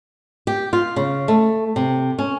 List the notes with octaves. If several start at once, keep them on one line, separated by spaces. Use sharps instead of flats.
G4
F4
C#3
A3
C3
C#4